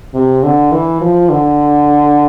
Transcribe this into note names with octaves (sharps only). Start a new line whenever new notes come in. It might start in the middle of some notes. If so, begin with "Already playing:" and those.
C3
D3
E3
F3
D3